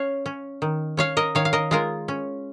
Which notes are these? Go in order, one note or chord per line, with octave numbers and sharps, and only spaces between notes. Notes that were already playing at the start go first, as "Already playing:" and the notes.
Already playing: C#4 C#5 F5
C#4
D#3
C#4 C#5 F5
A#4 D#5
D#3 C#5 F5
F5
A#4 D#5
G#3 F4 A#4
C#4